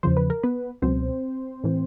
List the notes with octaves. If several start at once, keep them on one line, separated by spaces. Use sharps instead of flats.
E2 C#3 F3 C5
B4
A#4
B3 B4
C#2 B2 F#3 C4 C5
A2 E3